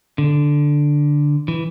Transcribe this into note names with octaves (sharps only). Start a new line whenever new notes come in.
D3
E3